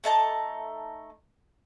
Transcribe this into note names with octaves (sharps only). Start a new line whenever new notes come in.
A3 D#4 A5 A#5